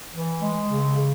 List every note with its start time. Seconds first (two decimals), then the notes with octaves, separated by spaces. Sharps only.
0.12 E3
0.40 G#3
0.68 C#3
0.96 C#3